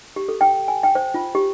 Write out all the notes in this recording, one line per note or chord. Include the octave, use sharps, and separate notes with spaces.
G4
A4
G5
G#5
G5
C5
F4
G4